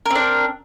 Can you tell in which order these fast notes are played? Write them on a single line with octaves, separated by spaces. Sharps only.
A#4 C4 D4